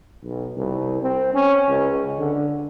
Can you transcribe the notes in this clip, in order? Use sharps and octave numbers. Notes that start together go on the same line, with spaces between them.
B1
C2
C4
C#4
C#2
D3